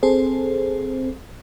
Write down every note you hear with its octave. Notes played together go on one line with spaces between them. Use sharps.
C4 G#4 A4 C5